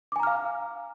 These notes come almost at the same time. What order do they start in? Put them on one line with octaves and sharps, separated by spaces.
D6 G#5 A#5 F6 F5